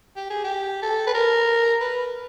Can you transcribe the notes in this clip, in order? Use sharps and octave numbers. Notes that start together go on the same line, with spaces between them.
G4
G#4
G4
A4
B4
A#4
B4